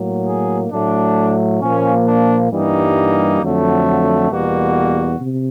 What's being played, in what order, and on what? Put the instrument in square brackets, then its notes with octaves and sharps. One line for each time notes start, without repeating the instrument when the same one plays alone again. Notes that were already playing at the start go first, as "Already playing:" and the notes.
Already playing: [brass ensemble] A2 F#3 A#3
G#4
A2 F#3 A3 D4
A#2 F3 A#3 C#4
D4
G2 E3 G3 A#3 D#4
F2 D3 F#3 A3
F4
E2 B2 G3 A#3 F#4
C3